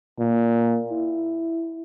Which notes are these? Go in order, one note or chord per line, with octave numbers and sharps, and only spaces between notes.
A#2
E4